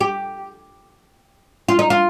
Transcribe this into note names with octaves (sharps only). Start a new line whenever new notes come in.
G4
F4
D#4
F4